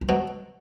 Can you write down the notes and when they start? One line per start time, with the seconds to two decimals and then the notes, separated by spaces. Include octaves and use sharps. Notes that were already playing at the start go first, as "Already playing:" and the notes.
0.01 G3
0.09 B2 F#3